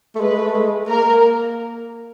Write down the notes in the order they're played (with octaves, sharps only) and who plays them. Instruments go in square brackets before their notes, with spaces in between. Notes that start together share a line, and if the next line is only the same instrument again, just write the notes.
[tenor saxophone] A3
[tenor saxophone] G#3 [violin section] B4
[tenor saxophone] A3
G#3
[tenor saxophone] A#3 [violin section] A#4